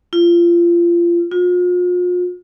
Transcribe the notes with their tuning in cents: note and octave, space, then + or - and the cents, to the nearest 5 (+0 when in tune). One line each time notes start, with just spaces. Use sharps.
F4 -25
F4 +40